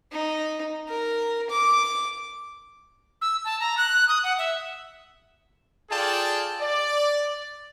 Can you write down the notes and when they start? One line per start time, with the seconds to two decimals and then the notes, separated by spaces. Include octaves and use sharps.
0.12 D#4
0.89 A#4
1.50 D6
3.22 E6
3.45 A5
3.60 A#5
3.78 F#6
4.08 D#6
4.24 F#5
4.39 E5
5.90 F4 G#4 A4 D5 G5 A5
6.61 D5